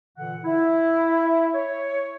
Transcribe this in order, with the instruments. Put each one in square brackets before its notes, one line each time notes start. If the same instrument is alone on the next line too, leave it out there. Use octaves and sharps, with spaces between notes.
[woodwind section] A#2 D3 E3 F#5
E4
C#5